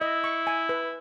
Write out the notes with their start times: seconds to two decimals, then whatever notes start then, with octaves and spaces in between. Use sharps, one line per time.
0.01 E4 D#5
0.24 C#6
0.47 G#5
0.69 B4